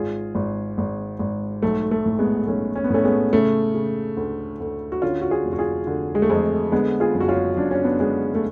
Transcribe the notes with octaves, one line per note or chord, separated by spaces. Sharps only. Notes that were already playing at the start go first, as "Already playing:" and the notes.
Already playing: G#1 F4 G#4
G#1
G#1
G#1
B1 A3
A3
A2
G#3 B3
B1 A3 C#4
C#4
B3
A2 A3 C#4
G#3 B3
C#3 A3
C#3
D2
D2
F#4
D3 C#4 F4
F#4
F4 G#4
F1
F#4
F4 G#4
D3
G#3
A3
F2 G#3
D3 G#3 B3
F4 G#4
F#1
F#4
C#4 F4
F#1 D4
C#4
B3 D4
D3 G#3 B3
A3